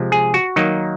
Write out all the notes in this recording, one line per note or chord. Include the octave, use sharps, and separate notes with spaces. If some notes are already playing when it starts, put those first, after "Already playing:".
Already playing: C3 F3 G#3
G#4
F#4
D#3 F#3 A#3 D#4